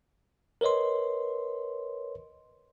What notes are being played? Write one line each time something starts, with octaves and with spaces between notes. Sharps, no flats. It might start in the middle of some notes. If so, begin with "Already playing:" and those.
A#4 B4 C#5 D#5 C6